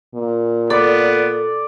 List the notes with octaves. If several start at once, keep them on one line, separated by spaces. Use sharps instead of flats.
A#2
B3 A4 D5